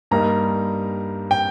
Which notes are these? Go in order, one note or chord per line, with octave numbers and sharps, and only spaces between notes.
G2 G3 A#3 D#4 A#5
G5